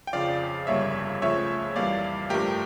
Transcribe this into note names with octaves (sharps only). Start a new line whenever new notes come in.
G5
F2 C#3 F3 D5 F5
G1 F2 C#3 G3 A#3 C#5 E5
C#2 C#3 F3 A3 C#5 E5
F2 E3 G3 A#3 D5 F5
G2 F3 A3 G4 A#4